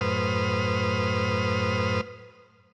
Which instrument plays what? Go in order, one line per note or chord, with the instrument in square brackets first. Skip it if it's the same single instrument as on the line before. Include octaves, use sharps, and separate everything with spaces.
[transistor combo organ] F#2 A2 B4 C5 D#6 F6